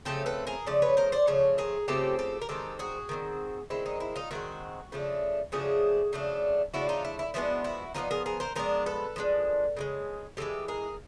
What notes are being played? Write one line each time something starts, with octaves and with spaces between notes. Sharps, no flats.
C#3 F3 A3 C4 G4 A4
A4 B4
G#4 A#4
C#3 F3 A3 D5
B4 C#5
A#4 C5
C5 D5
C#3 F3 A3 C#5
G#4 A#4
C#3 F3 A3 C4 G4 A4
G4 A4
A#4
D#3 G#3 C4 G4 A4
F#4 G#4
D#3 G#3 C4
D#3 G#3 C4 E4
D#4
E4
D#4 F4
D#3 G#3 C4 E4 F#4
C#3 F3 A3 D4
C#3 F3 A3 D4 F#4 G#4
C#3 F3 A3 D4
C#3 F3 A3 D4 E4 F#4
D#4 F4
E4
E4
F3 G#3 B3 D4 E4 F#4
E4 F#4
F3 G#3 B3 D4 D#4 F4
G#4 A#4
G#4 A#4
A#4 C5
F3 G#3 B3 D4 A#4 C5
A4 B4
F3 G#3 B3 D4
C#3 E3 G#3
C#3 E3 G#3 G4 A4
G#4 A#4